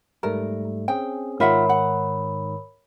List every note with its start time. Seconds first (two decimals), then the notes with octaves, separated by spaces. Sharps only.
0.23 G#2 G3 A3 A#4
0.88 C4 C#4 G#4 G5
1.40 G#2 D#3 F4 A#4 C#5 E5 F#5 B5
1.69 F#5